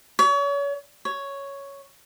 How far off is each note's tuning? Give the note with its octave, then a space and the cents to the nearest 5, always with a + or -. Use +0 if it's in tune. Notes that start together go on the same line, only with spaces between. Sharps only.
C#5 +35
C#5 +5